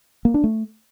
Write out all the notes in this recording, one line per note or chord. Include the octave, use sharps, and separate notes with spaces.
A#3
D4
A3